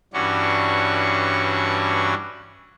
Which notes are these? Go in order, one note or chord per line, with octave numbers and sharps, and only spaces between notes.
G2 E3 C#4 D4 F#4 C#6